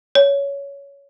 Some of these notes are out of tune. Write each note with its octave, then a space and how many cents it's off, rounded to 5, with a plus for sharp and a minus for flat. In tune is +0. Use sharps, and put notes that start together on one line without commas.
C#5 +15